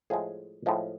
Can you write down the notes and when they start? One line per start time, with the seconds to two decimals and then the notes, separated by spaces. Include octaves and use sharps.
0.10 A2 F3 G#3 G#4
0.66 A2 F3 G#3